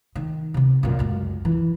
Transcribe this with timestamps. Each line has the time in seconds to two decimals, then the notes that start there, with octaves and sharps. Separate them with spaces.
0.15 D#3
0.54 C3 B3
0.83 F#2 A#2
0.99 C#2 F#2
1.45 E3